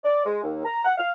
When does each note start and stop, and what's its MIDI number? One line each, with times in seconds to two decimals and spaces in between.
0.04 0.22 74
0.25 0.40 56
0.43 0.61 39
0.65 0.82 82
0.85 0.94 78
0.98 1.11 77